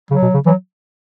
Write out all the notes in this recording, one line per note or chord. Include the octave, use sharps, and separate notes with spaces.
C#3 F#3
B2
C#3
E3 F#3